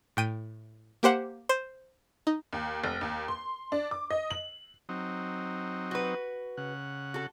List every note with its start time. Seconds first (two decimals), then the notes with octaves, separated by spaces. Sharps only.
0.17 A2 G5 D#7
1.03 A#3 G4 C5 F#5
1.49 C5
2.27 D#4
2.53 D#2
2.84 F1
3.01 D#2
3.28 C6
3.72 D4
3.91 D6
4.11 D#5
4.31 F#7
4.89 F#3 C4 D#4
5.91 F#4 B4
6.57 C#3 F#5
7.14 F#4 A4